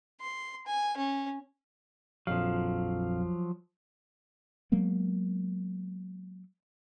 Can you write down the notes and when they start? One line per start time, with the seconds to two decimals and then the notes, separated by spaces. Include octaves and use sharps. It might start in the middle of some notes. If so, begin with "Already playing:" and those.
0.21 C6
0.67 G#5
0.97 C#4
2.27 A#1 F2 F3 F#3 F5
4.72 F#3 G#3 A#3 B3